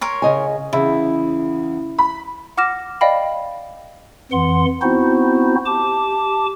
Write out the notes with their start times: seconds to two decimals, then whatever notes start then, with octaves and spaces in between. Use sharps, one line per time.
0.01 A#4 C#5 C6
0.22 C#3 D#5 G#5
0.73 E2 C#3 E4
1.98 B5
2.57 F#5 D6 F6 A#6 E7
3.01 D5 D#5 F5 G5 B5
4.32 F2 E3 F#5 C6
4.82 B3 C4 D#4 E4 F#4 C5
5.66 G4 A5 D6